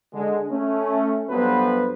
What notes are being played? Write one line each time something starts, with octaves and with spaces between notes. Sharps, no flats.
D3 G#3
A3 C#4
G2 F#3 B3 A4 B4 C5